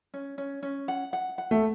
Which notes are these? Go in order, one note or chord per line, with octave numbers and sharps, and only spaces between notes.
C#4
C#4
C#4
F#5
F#5
F#5
A3